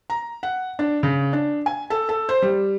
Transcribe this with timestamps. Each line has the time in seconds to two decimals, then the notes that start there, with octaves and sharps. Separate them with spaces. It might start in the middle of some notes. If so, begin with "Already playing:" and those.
0.10 A#5
0.43 F#5
0.79 D4
1.03 C#3
1.33 D4
1.66 G#5
1.90 A4
2.09 A4
2.29 C5
2.42 G3